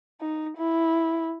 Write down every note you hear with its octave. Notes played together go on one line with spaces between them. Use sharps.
D#4
E4